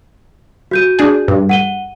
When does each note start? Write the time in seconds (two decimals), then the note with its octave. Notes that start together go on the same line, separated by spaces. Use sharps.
0.71 F#4 G6 D#7
0.99 D4 G#4
1.28 G2
1.49 F#5 D#7 G7